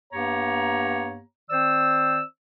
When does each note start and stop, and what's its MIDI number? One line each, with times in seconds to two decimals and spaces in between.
0.12 1.20 43
0.12 1.20 58
0.12 1.20 59
0.12 1.20 67
0.12 1.20 73
0.12 1.20 82
1.50 2.21 51
1.50 2.21 60
1.50 2.21 72
1.50 2.21 74
1.50 2.21 88